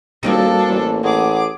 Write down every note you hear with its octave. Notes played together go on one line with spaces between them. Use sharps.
D#1 G3 A#3 C4 D4 D#4 F#4 A4
A1
A1 G#4 F#5 D6